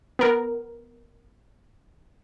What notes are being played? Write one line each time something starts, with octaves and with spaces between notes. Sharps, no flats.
B3 A#4